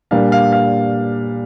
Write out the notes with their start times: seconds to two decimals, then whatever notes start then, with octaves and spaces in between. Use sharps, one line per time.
0.11 A#2 G3 A#3 D4 F5
0.32 F5
0.53 F5